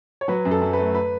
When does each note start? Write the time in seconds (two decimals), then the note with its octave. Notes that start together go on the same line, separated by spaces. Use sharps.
0.21 C#5
0.28 F#3 B4
0.45 F#2
0.51 A4
0.62 F#2
0.73 B4
0.79 A3
0.95 B4